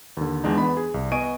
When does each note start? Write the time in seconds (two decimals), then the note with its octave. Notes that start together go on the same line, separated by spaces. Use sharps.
0.17 D#2 D3
0.44 E2 G#3 D4 D#4
0.58 E2 B3 B5
0.77 G#4
0.94 C2
1.12 B3 D#5 G#5 C#6 D7 D#7